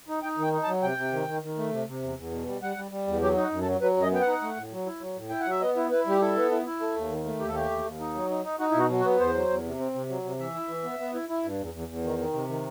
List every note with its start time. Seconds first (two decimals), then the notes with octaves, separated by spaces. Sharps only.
0.09 D#4
0.22 D#4 G5
0.38 D#3 G5
0.52 D#4
0.63 A5
0.67 F#3
0.83 C3 G5
0.97 C3
1.13 D#3
1.27 D#3
1.43 D#3
1.57 A3
1.72 C3
1.87 C3
2.03 E2
2.17 E2
2.32 B2
2.47 G3
2.62 G3 F#5
2.77 G3
2.91 G3
3.07 E2
3.21 F#3 G4
3.37 D#4 F#4
3.52 F#2
3.61 A4
3.66 F#3
3.81 F#3 B4
3.97 F#2
4.02 D#5
4.12 B3 G5
4.21 F#5
4.27 D#4
4.42 A3
4.57 A2
4.72 F#3
4.86 E4
5.01 F#3
5.16 A2
5.30 E4 G5
5.40 F#5
5.47 F#3 E5
5.61 B3 D#5
5.76 E4
5.91 E4 B4
6.06 G3 G4
6.21 E4 A4
6.36 B3
6.51 E4
6.66 E4
6.80 A3
6.96 D#2
7.10 D#3
7.25 A3
7.40 D#2 G4
7.48 A4
7.54 A3 G4
7.70 D#2
7.85 D#2
8.00 D#4
8.15 F#3
8.30 D#4
8.45 D#4
8.59 D#4 F#4
8.70 E4
8.74 B2 F#4
8.90 F#3
9.00 F#4
9.04 B3
9.20 E2 C5
9.34 F#3
9.49 E2
9.64 C3
9.79 C4
9.94 C3
10.09 F#3
10.24 C3
10.39 E3 E5
10.54 E4
10.69 E3
10.83 B3
10.99 B3
11.14 E4
11.29 E4
11.44 G2
11.59 E2
11.74 E2
11.88 E2
12.04 D#3
12.18 D#3
12.34 C3
12.48 D#3